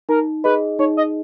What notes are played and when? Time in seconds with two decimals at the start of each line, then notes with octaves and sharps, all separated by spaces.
0.09 D#4 A#4
0.44 G#4 B4 D#5
0.79 D#4 C#5
0.97 D#5